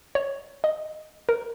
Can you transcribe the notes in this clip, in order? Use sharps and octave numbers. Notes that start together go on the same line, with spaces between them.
C#5
D#5
A#4